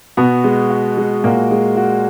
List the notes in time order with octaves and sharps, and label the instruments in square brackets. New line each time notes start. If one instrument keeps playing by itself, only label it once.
[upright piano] B2 B3 [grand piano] F#4
[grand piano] G#3
F#4
G#3
[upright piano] A#2 A#3 [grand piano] F#4
[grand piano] G#3
F#4